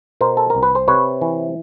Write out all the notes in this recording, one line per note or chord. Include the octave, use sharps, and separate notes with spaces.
B2 A#4 C5
A4
C2 A#4
B4
C5
C3 B4 C#5
E3